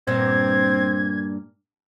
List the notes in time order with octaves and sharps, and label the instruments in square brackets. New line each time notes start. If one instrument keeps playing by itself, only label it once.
[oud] G2 A#2 B3 [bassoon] C4 [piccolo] G#6